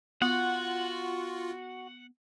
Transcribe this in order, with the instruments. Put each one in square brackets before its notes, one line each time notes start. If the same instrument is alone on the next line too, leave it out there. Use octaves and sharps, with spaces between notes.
[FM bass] B3 [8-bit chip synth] F4 [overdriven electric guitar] F#4 [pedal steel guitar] F#5